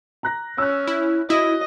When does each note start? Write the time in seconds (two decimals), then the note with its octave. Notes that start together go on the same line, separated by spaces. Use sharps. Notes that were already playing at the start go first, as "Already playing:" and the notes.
0.23 A#5 F#6 A#6
0.58 C#4 E6 F#6
0.87 E4
1.30 E4 F#4 D#5